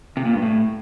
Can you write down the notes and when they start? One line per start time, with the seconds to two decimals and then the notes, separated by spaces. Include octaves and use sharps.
0.17 C3
0.25 A#2
0.34 G2
0.42 A2